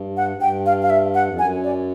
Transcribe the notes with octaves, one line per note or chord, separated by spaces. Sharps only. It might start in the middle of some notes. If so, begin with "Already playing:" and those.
Already playing: G2
F#5
G#2
G2 G5
F5
F5
E5
F#5
F2
F#2 G#5
D5